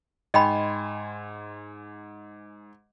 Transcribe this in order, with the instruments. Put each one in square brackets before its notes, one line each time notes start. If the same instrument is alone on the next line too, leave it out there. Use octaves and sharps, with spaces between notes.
[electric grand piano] G#2 G#5 C6 [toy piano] D#5 G5 B5